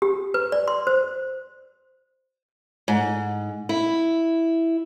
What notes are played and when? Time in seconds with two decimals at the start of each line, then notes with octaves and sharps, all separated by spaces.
0.02 G4
0.34 B4
0.52 D5
0.68 C6
0.87 C5
2.88 G#2
3.69 E4